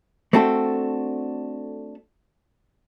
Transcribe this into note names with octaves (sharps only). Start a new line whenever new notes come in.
A3 C4 D4 F#4 A4